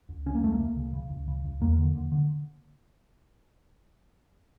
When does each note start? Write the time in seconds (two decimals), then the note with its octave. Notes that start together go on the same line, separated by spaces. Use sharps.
0.09 C#2
0.26 C#3 C#4
0.35 A#3
0.43 C#2 A3
0.52 A#3
0.60 C#2
0.77 C#3
0.94 C#3
1.10 C#2
1.28 C#3
1.45 C#2
1.61 E2 A#3
1.78 D3
1.95 D3
2.12 D3